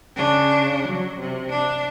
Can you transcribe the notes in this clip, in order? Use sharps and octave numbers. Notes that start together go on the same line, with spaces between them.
C#3 D4
F#3
C3
D4